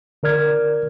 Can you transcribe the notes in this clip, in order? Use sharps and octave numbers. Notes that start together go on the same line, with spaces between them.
D3 A#4 D5 F6 G#6